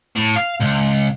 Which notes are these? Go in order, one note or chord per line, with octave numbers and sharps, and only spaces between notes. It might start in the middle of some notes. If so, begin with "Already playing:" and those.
A2
F5
C#2